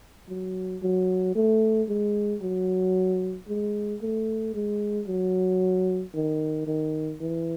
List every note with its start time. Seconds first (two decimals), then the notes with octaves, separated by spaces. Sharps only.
0.29 F#3
0.82 F#3
1.35 A3
1.89 G#3
2.42 F#3
3.48 G#3
4.02 A3
4.54 G#3
5.08 F#3
6.14 D#3
6.67 D#3
7.21 E3